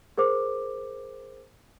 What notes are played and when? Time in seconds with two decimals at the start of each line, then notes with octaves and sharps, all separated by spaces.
0.18 G#4 A#4 C5 D6